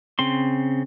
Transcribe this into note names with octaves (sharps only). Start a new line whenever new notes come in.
C#3 C4 C6